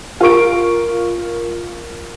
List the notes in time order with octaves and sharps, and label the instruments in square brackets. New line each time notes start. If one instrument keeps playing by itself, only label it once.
[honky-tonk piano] F4 A#4 C#6 D7